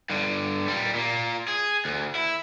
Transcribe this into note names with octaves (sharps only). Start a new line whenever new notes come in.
G2 D3
A#2 G3
A#2 A#3
G#4
D2
E4